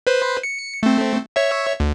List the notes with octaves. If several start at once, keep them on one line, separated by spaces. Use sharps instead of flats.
B4 C5
C#7
A3 C4
C#5 E5
D2